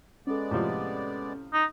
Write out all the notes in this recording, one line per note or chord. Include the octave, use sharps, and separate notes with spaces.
G#3 B3 C#4 A4 D5
A2 C3 F3
D#4